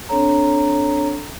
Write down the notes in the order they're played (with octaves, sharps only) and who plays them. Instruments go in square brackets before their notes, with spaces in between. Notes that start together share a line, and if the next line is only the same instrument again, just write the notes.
[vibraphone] C4 D4 A4 C#5 A#5